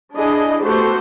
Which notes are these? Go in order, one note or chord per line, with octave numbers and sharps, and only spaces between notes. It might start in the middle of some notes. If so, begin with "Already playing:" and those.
D4 E4 G#4 D#5
A3 B3 F#4 G4 A4 C5